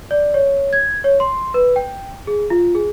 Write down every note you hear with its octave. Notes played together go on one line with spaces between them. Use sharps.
D5
C#5
G#6
C#5
C6
B4
G5
G#4
F4
G#4